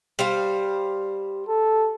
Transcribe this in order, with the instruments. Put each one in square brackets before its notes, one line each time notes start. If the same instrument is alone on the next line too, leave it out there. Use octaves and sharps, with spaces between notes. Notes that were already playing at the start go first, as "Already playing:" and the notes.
[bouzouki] G3 C5 F5
[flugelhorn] A4